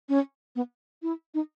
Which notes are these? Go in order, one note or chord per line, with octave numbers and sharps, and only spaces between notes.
C#4
B3
E4
D#4